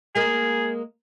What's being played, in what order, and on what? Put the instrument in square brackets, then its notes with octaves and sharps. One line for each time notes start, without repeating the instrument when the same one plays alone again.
[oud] G#3 A#3 [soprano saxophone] G#4